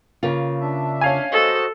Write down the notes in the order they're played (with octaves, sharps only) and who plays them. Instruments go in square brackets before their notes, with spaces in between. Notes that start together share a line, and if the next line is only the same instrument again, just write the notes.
[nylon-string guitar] C#3 A#3 F4
[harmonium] D4 E5
[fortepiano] C#4 F5 G#5
[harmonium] F#4 C5 D#5 [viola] A4